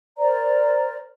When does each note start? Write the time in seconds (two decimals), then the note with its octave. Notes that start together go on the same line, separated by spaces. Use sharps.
0.18 A#4 C5 D5 A#5